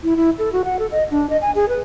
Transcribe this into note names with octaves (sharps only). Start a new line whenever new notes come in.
E4
E4
A4
F#4
F#5
A4
D#5
D4
D#5
G#5
G#4
B4